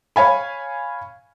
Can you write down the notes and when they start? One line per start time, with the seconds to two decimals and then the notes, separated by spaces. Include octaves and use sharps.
0.16 C#5 F5 G#5 B5